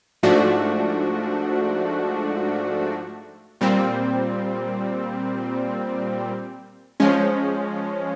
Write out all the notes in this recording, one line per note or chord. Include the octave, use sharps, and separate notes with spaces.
G#2 F3 A3 D4 F#4
A#2 G3 C4
F3 G#3 C#4